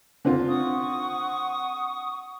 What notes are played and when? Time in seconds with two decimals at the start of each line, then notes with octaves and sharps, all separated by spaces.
0.25 D3 C4 F4
0.48 F#5 C#6 D#6